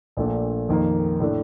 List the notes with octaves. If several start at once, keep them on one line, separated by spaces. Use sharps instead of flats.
A#1 A#2 A3 D4
F2 D#3 A#3
A2 A3 D4